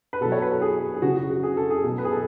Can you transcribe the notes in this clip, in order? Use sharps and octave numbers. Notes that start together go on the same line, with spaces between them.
B4
B2 F#3 A4
C#5
B4
A4
G#4
G#4
C#3 F#3 F#4
F#4
F#4
G#4
A4
G#4
B2 F#3
B4
G#4
A4